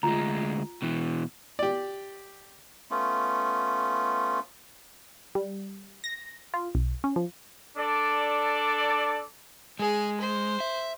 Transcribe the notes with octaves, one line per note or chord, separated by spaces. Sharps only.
D2 G#3 F4 A#5
B2 E3
G4 D5
A3 B3 C#4 F4
G3
A#6
F4
B1
C#4
F3
D4 A4 D5
G#3 G#4
C5
E5